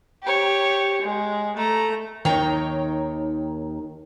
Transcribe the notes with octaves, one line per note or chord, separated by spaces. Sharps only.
G4 C#5
G#3
A3 A#5
D#2 D#3 D#4 C#5 G5 A#5